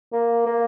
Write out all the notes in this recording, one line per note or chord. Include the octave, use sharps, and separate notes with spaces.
A#3
A#3